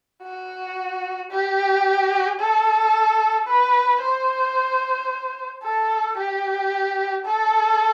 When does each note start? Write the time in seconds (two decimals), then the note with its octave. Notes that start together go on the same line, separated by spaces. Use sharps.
0.23 F#4
1.31 G4
2.40 A4
3.47 B4
4.01 C5
5.63 A4
6.17 G4
7.25 A4